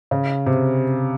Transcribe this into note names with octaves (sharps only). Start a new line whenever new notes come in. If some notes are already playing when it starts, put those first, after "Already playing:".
C#3
C3